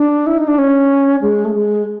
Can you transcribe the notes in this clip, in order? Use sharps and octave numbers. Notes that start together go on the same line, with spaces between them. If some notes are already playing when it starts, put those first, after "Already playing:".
Already playing: D4
E4
D#4
D4
C#4
G#3
A3
G#3